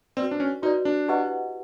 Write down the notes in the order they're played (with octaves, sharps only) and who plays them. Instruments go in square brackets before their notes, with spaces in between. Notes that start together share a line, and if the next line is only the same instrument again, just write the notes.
[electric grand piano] C4 [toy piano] F#4 B4 D5
[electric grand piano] D4
C#4
[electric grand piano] D#4 [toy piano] F#4 B4 D5
[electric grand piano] D4
[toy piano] E4 G4 B4 D#5 F#5